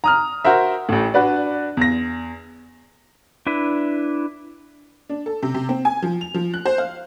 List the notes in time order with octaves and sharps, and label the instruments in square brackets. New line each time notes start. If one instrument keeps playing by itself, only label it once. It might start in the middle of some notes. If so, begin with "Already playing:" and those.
[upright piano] A#5 D#6 F6
F#4 A#4 C5 E5
A1 A2
D4 F#4 B4 D5
E2 A#6
[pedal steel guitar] D4 E4 B4
[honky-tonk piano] D4
A4
C3
C3
C4
G#5
F3
F7
F3
F#6
C5
F5